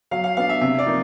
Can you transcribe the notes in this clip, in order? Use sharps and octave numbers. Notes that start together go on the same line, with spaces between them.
F#3 F5
F5
B3 D4 F5
E5
C3 E5
D5
F3 A#3 D#4